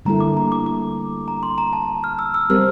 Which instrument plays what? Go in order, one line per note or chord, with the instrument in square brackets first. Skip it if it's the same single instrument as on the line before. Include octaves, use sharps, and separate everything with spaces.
[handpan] D3 G3 A#3 E4 A4 [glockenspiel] A#5
[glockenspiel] D6
A#5
D6
D6
A#5
C6
A#5
A5
F6
E6
E6
[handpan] G3 C4 G4 A#4 [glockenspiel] F6